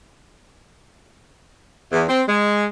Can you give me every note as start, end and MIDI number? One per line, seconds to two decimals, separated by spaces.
1.92 2.04 40
2.09 2.23 60
2.28 2.66 56